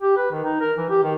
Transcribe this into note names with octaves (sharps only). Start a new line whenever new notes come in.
G4
B4
D#3
D#4
A#4
E3
G4
D#3